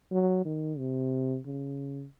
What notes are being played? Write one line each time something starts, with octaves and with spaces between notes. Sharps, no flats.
F#3
D#3
C3
C#3